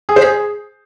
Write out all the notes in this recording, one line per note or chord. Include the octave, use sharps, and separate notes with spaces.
G#4
C5
G#4